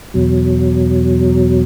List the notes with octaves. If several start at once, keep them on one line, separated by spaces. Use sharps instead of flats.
E2 B2 F#3